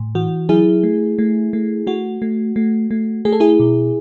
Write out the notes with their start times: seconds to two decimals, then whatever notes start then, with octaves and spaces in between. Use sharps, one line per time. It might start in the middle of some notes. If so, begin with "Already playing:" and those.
Already playing: A2
0.15 E3 F#4
0.49 F#3 E4 G#4
0.83 A3
1.19 A3
1.53 A3
1.87 A3 F#4
2.22 A3
2.56 A3
2.91 A3
3.25 A3 G#4
3.33 A4
3.40 E4 G#4
3.60 B2